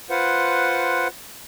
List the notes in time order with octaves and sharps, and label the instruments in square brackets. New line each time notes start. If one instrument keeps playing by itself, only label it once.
[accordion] F4 B4 C5 F#5